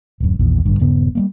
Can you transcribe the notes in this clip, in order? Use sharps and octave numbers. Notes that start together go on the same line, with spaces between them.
D1 F#2
A#1 E2 A#2 D#3
A1 G2 D3
D#1 G2 C#3 B3
G3 G#3 A#3